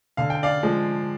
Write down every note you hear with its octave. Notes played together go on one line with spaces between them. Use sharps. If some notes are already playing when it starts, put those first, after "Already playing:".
D3 F5
G5
D5 F5
F3 G#3